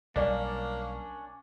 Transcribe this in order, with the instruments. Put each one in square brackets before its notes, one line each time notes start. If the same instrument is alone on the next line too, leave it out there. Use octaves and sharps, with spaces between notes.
[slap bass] B1 G3 [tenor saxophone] A#3 [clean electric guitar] C#4 D4 [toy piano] D5 F5